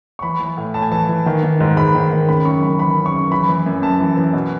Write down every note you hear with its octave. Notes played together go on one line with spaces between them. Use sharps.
C#6
E3 B5
E3
A2
A2 A5
G#5
E3 A5
E3
D#3
D#3
G#2
G#2 B5
D#3
D#3
C#3 B5
F#2 C#6
F#2 B5
E3 B5
C#3
C#6
F#2
E3 B5
E3
F#2
F#2 A5
E3
E3
B2